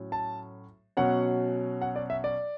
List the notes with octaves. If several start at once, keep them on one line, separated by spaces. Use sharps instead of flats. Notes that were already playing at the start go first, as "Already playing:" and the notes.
Already playing: A2 F#3 C#4
A5
B2 F#3 C#4 F#5
F#5
D5
E5
D5